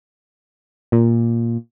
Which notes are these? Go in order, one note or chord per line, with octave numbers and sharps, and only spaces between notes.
A#2